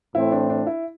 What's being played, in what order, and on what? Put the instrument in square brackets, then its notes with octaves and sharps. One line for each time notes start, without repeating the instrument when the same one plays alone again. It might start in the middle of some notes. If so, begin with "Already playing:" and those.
[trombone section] A2 E3 A3 C4 [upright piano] E4
[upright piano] D4
D4
E4